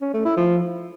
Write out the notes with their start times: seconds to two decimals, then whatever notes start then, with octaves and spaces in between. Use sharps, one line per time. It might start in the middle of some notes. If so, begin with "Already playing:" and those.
0.02 C#4
0.14 A3
0.25 E4
0.37 F3